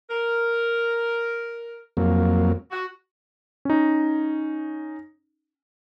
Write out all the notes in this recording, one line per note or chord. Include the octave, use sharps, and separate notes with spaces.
A#4
F2 F#3 A#3
F#4
C#4 D#4